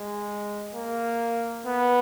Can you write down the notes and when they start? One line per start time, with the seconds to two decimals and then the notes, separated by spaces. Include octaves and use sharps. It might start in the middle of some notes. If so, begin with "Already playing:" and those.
Already playing: G#3
0.73 A#3
1.66 B3